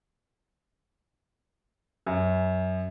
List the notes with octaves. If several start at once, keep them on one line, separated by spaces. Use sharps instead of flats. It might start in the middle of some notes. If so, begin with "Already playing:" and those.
F#2